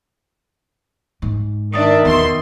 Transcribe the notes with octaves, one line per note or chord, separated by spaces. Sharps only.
G#2
D#3 D4 E5 D#6 A6
E2 B2 C6